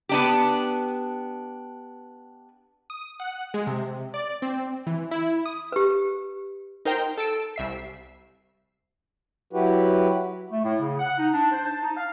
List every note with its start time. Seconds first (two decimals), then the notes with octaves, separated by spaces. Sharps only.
0.09 B3 D4 G4
2.90 D#6
3.20 F#5
3.54 G#3
3.67 C3
4.14 D5
4.42 C4
4.87 E3
5.11 E4
5.46 D#6
5.72 G4 B4
6.85 D#4 A#4 C5 G5
7.17 A4 E6 D7
7.56 C2 E5 C7
9.53 F#3 E4 F#4 G4 B4
10.52 A3
10.64 A2
10.80 C#3
10.99 F#5
11.18 D#4
11.34 D4
11.52 C5
11.66 A5
11.83 D#4
11.97 F5